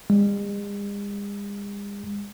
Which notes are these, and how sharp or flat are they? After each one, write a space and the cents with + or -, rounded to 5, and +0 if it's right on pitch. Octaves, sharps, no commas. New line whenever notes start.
G#3 -45